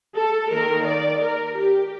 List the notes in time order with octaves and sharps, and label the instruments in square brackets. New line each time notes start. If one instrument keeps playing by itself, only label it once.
[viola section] A4
D#3 A#3 D#4 A#4
D5
A#4
G4